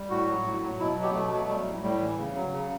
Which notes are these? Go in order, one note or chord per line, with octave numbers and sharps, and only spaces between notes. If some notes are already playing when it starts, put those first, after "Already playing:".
Already playing: G3
A2 F#4
F#3
A2
F#3
B2 E4
F#3
G4
B2 A3
F#3
G3
A2
A2 G3
E3
C#3
F#3
C#3